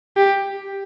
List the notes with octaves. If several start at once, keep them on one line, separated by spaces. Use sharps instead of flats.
G4